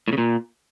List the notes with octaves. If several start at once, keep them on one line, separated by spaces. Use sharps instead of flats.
A2
C#3
A#2